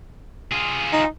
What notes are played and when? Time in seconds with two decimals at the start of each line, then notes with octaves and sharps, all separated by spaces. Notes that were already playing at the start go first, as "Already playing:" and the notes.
0.52 F4 G#4
0.93 D#4